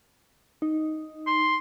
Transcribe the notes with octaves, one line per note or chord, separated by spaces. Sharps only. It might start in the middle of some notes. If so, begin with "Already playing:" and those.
D#4
C6